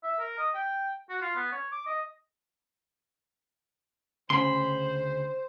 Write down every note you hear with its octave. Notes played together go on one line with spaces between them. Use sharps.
E5
A#4
D#5
G5
F#4
F4
B3
C#5
D6
D#5
D2 C#3 C5 B5 C6